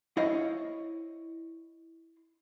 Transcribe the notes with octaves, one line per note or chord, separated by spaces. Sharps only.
E4 C5 C#5 D#5 F5